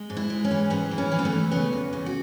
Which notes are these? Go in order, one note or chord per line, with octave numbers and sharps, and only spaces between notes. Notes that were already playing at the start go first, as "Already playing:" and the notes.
Already playing: G#3
G#2
E4
G#3
C#4
E3
G#2 B3
E3
C#4
E3
B3
A3
E3
C#3 B3
E2
C#3
F#4